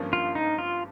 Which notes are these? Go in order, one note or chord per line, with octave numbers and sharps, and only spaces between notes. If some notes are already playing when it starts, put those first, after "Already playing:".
Already playing: G#1 G2 F3 A#3 C#4
F4
D#4
F4